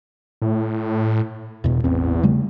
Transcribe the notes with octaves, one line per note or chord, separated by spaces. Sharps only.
A2
E1 E2 B2
A1 E2 C4
C#3 G3 A3